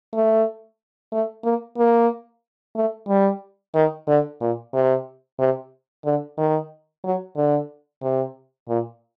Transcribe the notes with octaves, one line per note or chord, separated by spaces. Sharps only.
A3
A3
A#3
A#3
A3
G3
D#3
D3
A#2
C3
C3
D3
D#3
F#3
D3
C3
A#2